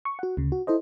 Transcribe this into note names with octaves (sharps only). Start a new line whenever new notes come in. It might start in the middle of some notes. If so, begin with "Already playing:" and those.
C#6
F#4 F#5
D2 C#3
F#4
E4 A4 C5 D#5